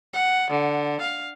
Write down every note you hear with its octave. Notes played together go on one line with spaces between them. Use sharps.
F#5
D3
F5